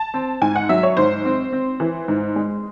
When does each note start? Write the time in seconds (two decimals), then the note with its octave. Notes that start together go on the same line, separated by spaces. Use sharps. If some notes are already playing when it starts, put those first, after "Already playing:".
Already playing: A5
0.14 C4
0.41 G#2 G#5
0.56 F#5
0.69 F#3 E5
0.83 C#5
0.97 G#2 C5
1.25 C4
1.53 C4
1.80 E3
2.08 G#2
2.36 G#3